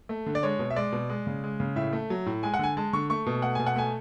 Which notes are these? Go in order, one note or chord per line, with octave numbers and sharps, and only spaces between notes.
A3
D3
D5
G#3 C#5
B2
E5
G#3 D5
B2
G#3
C#3
G#3
C#3
A2 E5
A3
F#3
A2
G#3 G#5
F#5
D3 G#5
G#3 A5
D3 C#6
A3 C#6
B2
A3 F#5
B2 G#5
F#5
A3 G#5